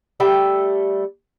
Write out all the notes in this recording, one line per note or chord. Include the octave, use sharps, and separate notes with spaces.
G3 A3 E5 G5